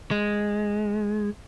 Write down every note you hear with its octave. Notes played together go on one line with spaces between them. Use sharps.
G#3